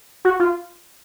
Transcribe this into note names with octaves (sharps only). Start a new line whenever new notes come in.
F#4
F4